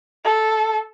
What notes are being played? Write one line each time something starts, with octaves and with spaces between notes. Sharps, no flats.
A4